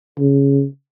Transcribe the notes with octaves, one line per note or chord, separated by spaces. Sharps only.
C#3